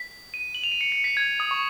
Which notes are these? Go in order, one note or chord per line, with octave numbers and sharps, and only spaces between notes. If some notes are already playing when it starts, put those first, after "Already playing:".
Already playing: B6
D#7
F#7
F7
D#7
C#7
C#7
B6
G#6
D#6
C#6